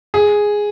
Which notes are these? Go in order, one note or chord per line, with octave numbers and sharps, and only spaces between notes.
G#4